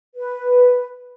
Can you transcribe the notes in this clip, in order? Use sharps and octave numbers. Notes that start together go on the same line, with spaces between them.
B4